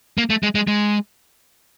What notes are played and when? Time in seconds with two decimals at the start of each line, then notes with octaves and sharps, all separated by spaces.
0.18 A#3
0.30 A3
0.43 G#3
0.55 G#3
0.67 G#3